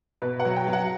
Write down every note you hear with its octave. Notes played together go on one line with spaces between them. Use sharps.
B2 B4
F#5
F#3
G5
F#3
F#5